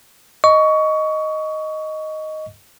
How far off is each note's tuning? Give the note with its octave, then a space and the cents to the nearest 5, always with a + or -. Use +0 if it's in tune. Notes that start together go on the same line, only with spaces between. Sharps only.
D#5 +0 C#6 +20